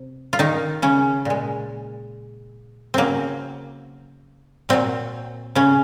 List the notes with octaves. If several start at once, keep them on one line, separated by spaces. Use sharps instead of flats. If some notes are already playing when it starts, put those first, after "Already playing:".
Already playing: C3
F4
D#3 D#4
C#3 C#4
A#2 G#3
C#3 F#3 A#3 C4
A#2 F#3 C4
C#3 C#4